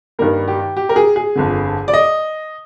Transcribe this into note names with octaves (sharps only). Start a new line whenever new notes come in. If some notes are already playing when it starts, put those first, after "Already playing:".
G2 D#3 G3 A#3 A#4
G4
G4
A#4
G#4
G#4
G1 F2 D3
D5
D#5